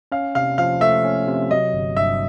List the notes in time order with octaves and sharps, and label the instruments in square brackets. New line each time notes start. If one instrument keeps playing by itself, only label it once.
[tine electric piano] C#4 [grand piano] F5
[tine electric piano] C3 [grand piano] F5
[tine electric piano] F3 [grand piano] F5
[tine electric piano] A3 [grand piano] E5
[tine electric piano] C#4
C3
[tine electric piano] F#3 [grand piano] D#5
[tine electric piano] G1
[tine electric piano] G2 [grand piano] E5